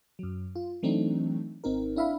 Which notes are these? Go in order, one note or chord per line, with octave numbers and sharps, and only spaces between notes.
F#2 F#3
F4
E3 F#3 A3 C4 D4 D#4
G#1 C4 D#4 A#4
D4 E4 E5 F5 B5